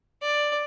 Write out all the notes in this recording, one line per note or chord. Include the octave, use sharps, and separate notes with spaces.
D5